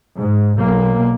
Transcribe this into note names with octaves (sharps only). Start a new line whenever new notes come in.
G#2
B1 A#3